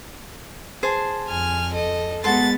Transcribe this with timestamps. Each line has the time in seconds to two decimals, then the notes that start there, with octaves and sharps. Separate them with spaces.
0.83 G#4 C5 A5
1.28 F2 G#5 F6
1.73 A4 D#5
2.24 G#3 B3 F#4 A4 C6 A6